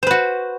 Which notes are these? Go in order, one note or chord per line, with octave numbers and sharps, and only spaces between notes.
F#4 B4 C5